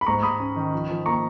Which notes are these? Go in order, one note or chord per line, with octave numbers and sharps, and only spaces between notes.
B5
G#2 A#5 C#6
G#2 B5 D#6
C#4
D#3
F3
F3
A#3 A#5 C#6